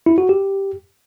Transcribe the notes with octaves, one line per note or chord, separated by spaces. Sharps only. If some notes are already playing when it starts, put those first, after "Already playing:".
E4
F#4
G4